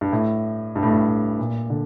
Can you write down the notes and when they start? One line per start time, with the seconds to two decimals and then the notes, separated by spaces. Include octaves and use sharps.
0.01 G2
0.12 A2
0.76 G2
0.83 A2
0.90 G2
1.06 A2
1.39 A#2
1.70 D3